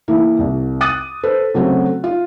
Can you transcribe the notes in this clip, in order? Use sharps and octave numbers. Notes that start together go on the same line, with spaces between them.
E3 A#3 E4
C2
D6 D#6 F#6 A6 D#7
A4 B4 C5
C#3 F#3 A3 C4 F#4
F4